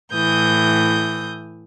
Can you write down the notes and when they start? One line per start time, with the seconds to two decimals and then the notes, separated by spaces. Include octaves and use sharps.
0.14 A2 E3 D#6 G6